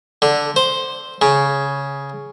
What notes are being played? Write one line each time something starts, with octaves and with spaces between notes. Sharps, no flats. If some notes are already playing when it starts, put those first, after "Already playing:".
D3
C5
C#3